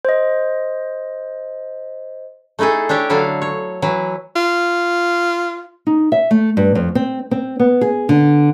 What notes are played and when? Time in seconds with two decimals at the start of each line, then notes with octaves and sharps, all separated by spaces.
0.05 C5 D#5
2.59 A3 D#4 E4 G#4 A4
2.89 D4 G4 C#5 E5
3.10 D3 F#3 E4 A4 F5
3.42 C#5
3.82 E3 F#3 E4
4.36 F4
5.87 D#4
6.12 E5
6.31 A3
6.57 G2
6.75 F2
6.95 C4
7.31 C4
7.59 B3
7.81 G#4
8.09 D3